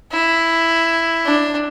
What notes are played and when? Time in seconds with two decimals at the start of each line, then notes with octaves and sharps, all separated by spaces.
0.12 E4
1.26 D4